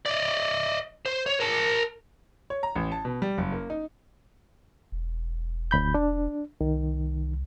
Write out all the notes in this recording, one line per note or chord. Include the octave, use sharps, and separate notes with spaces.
D5 D#5
C5
C#5
A#4 A5
C#5
A#5
A1
A5
B2
G3
F#1
A#3
D#4
E1
D2 B5 G6
D4
C2 D#3